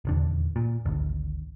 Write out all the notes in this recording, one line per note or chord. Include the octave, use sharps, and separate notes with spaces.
D#1 E2 D3
A#2
G#1 D2